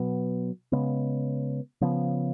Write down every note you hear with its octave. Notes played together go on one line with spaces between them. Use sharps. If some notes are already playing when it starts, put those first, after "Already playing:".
Already playing: B2 F#3 B3
C#3 G#3 B3
C#3 F3 B3